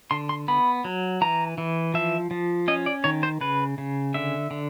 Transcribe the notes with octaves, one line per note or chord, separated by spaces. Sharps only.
D3 C6
C6
B3 B5
F#3
E3 A#5
E3
F3 E5
F3
C#4 D#5
D5
D#3 C#5
C5
C#3 B4
C#3
D3 E5
D3